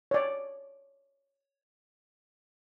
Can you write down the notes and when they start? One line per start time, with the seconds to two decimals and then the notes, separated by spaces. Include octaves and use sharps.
0.11 C#5 D5